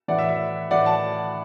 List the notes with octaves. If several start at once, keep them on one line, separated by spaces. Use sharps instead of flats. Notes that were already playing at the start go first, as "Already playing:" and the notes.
A2 E3 D5 F#5
E5
E5
A2 E3 D5 F#5
F#5 A5